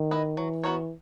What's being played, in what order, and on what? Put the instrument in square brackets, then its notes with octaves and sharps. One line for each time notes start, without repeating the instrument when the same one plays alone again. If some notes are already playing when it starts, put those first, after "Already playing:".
Already playing: [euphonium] D#3
[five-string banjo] E4 B4 D#5
[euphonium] E3 [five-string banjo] F#3
[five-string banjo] B3 F#4 A#4 C#5